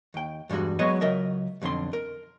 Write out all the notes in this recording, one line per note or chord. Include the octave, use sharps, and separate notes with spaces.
D#2 G5
E2 G2 G3 G#3 F#4
F#3 G#3 B3 B4 C#5 D#5
C#2 F#3 A#4 D#5 E5
B1 F2 D3 C4 C6
A#4